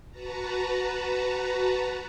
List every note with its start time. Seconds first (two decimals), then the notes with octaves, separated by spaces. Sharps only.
0.11 F#4 B4 A5 A#5